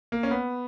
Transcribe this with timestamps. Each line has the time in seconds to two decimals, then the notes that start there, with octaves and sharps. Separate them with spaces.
0.12 A#3
0.23 C#4
0.31 B3